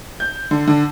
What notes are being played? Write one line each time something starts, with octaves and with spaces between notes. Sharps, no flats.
G6
D3
D3